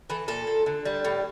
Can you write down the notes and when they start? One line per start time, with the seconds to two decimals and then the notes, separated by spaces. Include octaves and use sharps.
0.10 E3 A4
0.28 A#2 A4
0.47 A#2
0.66 D3
0.85 G3
1.05 A2